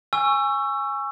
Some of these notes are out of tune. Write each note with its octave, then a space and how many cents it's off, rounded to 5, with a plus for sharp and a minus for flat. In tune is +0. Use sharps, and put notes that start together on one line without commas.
G#5 -10 C#6 +0 E6 +25